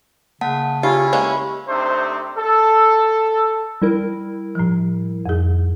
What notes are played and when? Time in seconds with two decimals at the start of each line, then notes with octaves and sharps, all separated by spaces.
0.41 C#3 A#3 F#5 A5
0.83 C#4 E4 F4 G4
1.13 G#3 A#3 C#5
1.67 C3 A3 D4 D#4 C5
2.37 A4
3.82 G3 E4 A#4
4.55 A2 F3
5.26 F2 G#4